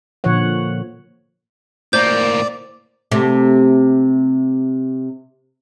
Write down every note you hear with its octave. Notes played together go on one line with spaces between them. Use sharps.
A#2 D3 F3 C#5 F#5
A2 A#3 C5 D5 G6
C3 A3